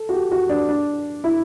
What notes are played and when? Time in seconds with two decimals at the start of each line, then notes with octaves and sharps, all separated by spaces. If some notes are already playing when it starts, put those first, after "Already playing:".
Already playing: A4
0.09 F#4
0.14 G4
0.32 F#4
0.49 D4
0.69 D4
1.24 E4